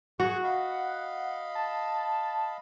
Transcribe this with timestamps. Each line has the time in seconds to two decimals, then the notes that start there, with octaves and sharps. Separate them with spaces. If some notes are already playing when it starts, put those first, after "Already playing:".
0.20 F#4 G#4 F#5 C#6 F#6
0.43 D#5 F5 B5
1.55 A5